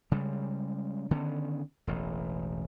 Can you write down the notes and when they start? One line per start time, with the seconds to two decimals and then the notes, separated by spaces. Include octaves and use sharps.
0.11 C#3 G3 G#3
1.11 D3 D#3 B3 C#4
1.87 E1 A1